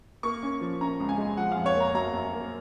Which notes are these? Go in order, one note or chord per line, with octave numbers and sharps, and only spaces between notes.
A#3 C#6
C#4
F3
C#4 A#5
C#2
G#5
G#3
F3 F#5
F2 F5
C#5
A#3
A#5
F#2 A#5
F#2
A#3